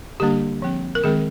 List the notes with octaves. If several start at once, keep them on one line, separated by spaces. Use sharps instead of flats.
D3 G3 A#3 D4 G4
F3 C4
A#4
D#3 G#3 C4 G#4